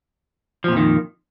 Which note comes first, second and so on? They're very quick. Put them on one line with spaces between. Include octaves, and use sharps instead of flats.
F3 A#2 F2 D#3